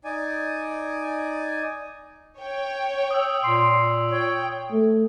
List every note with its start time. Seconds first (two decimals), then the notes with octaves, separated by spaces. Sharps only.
0.04 D#4 D5 G#5
2.39 C#5 G5
3.11 D#6 E6
3.44 A#2 C6 D7
4.11 C#5 G5
4.71 A3